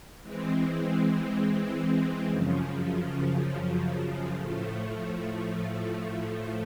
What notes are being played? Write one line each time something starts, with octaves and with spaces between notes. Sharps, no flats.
E3 G#3 C4
F#2 C#3 F3
A2 F3 A3